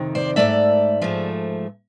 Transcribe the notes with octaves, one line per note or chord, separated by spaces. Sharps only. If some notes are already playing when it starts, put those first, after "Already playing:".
Already playing: F2 C3 D#3
C5 D5
G#2 F3 A3 D5 E5
G#2 F3 A3